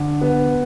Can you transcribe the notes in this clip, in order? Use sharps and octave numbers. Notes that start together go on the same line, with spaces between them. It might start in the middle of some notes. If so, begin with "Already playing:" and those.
Already playing: D3
B3